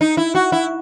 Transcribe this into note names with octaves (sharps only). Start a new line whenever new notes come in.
D#4
E4
F#4
E4